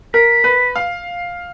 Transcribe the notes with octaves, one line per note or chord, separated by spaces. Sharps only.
A#4 B6
B4
F5